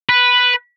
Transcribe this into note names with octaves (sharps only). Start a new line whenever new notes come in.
B4